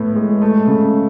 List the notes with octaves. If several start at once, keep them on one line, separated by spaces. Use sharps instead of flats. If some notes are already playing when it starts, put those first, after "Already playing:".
Already playing: A2 B3
G#3
A3
C#3